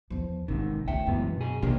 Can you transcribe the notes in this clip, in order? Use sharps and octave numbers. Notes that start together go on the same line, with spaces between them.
E2 F3
A1 G#2 C3 D#3
C#2 A3 E5 G5
C#2 F#2 E3 B3
B2 G#4
A#1 C3 A#3 D4 G4